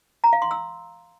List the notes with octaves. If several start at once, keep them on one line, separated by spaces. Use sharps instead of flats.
A#5
F5
C6
E6